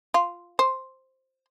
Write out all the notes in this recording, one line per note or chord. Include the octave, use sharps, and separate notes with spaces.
F4
C5